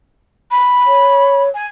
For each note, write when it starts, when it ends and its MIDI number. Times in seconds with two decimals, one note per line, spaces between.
0.51 1.43 83
0.87 1.50 73
1.55 1.67 80